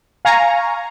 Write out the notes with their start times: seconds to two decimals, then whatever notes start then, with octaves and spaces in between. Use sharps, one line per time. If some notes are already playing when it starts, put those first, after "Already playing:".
0.25 F5 G#5 A#5 C#6